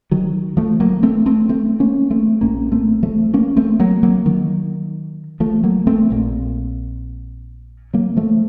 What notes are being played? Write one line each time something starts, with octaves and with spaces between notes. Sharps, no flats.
D#3 F#3
F3 A3
F#3 A#3
A3 C4
A3 C4
A3 C4
A#3 C#4
A3 C4
A#1 A2 A#3 C#4
A3 C4
F3 A3
A#3 C#4
A3 C4
F#3 A#3
F#3 A#3
D#3 F#3
F3 A3
F#3 A#3
A3 C4
A#1 A#2
F#3 A#3
F3 A3